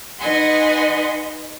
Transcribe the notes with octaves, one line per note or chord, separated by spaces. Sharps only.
D#4 B4 D#5 F#5 G#5 C6